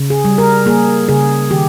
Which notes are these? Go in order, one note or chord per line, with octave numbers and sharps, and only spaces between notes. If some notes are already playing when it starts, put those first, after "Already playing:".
Already playing: C#3
G#4
G3
A#4
A#3 G#4
C#3 G#4
D#3 G4